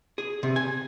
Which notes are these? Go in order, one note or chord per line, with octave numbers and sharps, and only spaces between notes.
G#4
C3
G#5